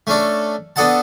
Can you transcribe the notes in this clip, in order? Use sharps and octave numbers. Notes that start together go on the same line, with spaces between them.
A3 C#4 D4 A4
B3 D4 A4 D#5 F#5 A5